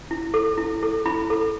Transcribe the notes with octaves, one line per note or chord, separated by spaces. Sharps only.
E4
A4
E4
A4
E4 B5
A4